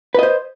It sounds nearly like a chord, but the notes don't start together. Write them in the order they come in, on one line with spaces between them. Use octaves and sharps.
B4 D#5 C5